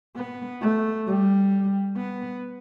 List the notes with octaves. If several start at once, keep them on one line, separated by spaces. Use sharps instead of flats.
B3
A3
G3
B3